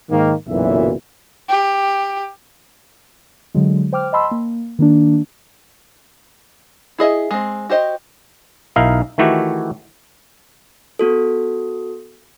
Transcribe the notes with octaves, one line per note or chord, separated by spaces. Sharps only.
G#2 D#3 A#3
F#1 B1 F#2 A#2 E3 E5
G4
D3 F#3 G#3
C5 G5 D6 F6
D#5 G5 A5 B5 C6 E6
A#3
D#3 A#3 D4
E4 G#4 D#5 E5
G#3 C4
F#4 G4 C5 D#5
B1 D#4 E4 A#4 F5
D#3 E3 A3 E4 F#4 G4
B3 F#4 A4